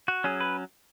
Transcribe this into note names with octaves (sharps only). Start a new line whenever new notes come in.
F#4
F#3 C#4 G#4
B4